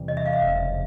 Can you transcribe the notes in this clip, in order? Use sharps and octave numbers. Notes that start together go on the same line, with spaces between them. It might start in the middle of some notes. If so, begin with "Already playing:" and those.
Already playing: E2 C3 E3 G3
D#5
E5
F5
E5
F1 E2 C#3